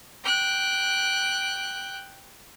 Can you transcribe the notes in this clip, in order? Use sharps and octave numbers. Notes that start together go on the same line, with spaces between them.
G5 F#6